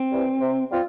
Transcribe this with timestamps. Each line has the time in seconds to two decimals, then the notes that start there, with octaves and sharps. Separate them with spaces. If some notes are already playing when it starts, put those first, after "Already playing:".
Already playing: C4
0.11 C3 E3 G3
0.40 C3
0.70 G3 C4 F4